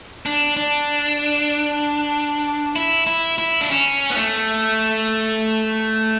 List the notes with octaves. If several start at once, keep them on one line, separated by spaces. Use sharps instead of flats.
D4
D4
E4
E4
E4
D4
C#4
B3
A3